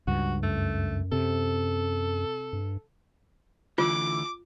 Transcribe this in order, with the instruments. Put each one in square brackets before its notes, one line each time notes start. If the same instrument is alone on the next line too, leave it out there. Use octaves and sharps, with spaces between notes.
[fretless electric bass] C#2 G2 [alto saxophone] F#4
[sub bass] F#2 [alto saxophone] A3
[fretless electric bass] C3 [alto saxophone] A4
[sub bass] G2
[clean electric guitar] D2 D3 E3 [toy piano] F4 [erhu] D6